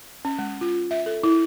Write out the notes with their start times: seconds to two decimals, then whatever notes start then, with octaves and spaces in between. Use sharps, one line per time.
0.25 C#4
0.39 G#3
0.61 F4
0.91 E5
1.06 A4
1.23 E4